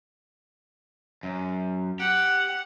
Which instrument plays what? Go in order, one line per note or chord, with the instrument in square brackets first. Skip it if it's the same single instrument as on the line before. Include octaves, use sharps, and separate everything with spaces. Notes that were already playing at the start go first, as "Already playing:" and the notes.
[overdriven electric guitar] F#2
[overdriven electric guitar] G4 [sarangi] F#5